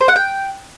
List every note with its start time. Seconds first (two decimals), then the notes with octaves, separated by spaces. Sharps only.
0.01 C5
0.08 F#5
0.16 G5